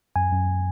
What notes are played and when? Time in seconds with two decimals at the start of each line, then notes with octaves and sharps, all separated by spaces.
0.16 F#2 G#5
0.32 F#2